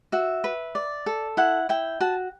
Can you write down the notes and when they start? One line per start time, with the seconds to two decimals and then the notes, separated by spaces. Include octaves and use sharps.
0.12 F#4 E5
0.44 B4
0.75 D5
1.06 A4
1.37 E4 F#5
1.69 E4 G5
2.01 F#4 A5